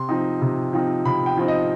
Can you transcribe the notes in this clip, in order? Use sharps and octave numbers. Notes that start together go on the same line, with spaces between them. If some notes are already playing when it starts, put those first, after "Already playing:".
Already playing: C3 C6
F3 C4 D#4
C3
F3 C4 D#4
C3 B5
G5
F3 C4 D#4
D#5